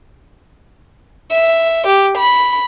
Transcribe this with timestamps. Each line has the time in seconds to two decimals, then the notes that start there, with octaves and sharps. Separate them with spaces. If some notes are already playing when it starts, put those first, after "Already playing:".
1.32 E5
1.87 G4
2.17 B5